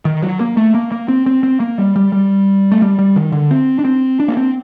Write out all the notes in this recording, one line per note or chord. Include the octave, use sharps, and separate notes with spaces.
D#3
F#3
A#3
A3
A#3
A#3
C4
C4
C4
A#3
G3
G3
G3
A3
G3
G3
D#3
D3
C4
D4
C4
D4
A#3
C4